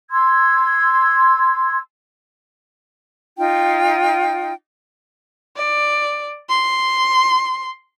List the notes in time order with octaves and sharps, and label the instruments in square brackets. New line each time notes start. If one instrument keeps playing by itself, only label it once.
[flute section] C6 E6 G#6
D#4 F4 G5
[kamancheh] D5
C6